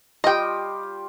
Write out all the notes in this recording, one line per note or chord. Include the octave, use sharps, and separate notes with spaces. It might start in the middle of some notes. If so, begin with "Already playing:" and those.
G3 F4 G4 D#5 G5